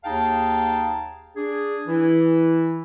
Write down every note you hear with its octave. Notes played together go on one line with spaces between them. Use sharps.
D#2 D#4 G#4 F5 G5 A5
D4 G#4
E3 E4